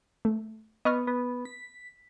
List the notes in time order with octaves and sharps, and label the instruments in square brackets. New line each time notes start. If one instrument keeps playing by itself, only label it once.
[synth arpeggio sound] A3
[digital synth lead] B3 [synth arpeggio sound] D#5 C#6 F6
[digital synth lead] B3
B6